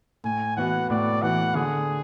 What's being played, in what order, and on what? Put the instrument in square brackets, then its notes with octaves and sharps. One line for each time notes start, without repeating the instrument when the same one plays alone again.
[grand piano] A2 [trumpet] G#5
[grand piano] E3 B3 F#4 [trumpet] F#5
[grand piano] A2 [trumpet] D5
[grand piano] E3 B3 F#4 [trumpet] F#5
[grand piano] D3 [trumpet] G#4